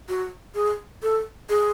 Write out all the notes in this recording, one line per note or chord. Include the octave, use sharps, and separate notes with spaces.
F#4
G#4
A4
G#4